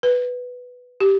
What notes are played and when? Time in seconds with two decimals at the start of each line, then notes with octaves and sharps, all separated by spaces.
0.03 B4
1.00 G4